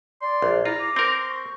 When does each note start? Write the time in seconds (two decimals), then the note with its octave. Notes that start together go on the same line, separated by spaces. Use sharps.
0.21 D5 C6
0.42 A#1
0.65 E4 F4 A#5
0.79 D6
0.96 C4 A#4 C5
1.29 C#6